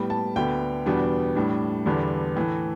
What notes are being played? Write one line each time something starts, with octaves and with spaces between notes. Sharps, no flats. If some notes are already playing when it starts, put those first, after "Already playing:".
Already playing: A2 G3 B3 G5
A5
D2 D3 B3 G5
E2 B2 G3 B3 D4
A2 G3 D4
E2 D3 G3 B3 D4
A2 E3 A3